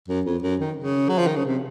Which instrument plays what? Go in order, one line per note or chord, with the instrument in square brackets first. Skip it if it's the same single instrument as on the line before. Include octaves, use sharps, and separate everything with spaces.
[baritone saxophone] F#2
F2
F#2
D#3
C#3
F#3
F3
D#3
C#3
C3